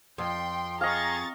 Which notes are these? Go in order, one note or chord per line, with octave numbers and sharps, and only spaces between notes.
F2 G5 C6
G#4 D#5 F5 A#5 C#6 A6